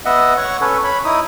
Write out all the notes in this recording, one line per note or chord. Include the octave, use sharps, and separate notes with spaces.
B3 D#5 E5 F#5
C#5 F#5 C#6
C#4 A4 B4 C#5
C#5 B5
D#4 E4 D#6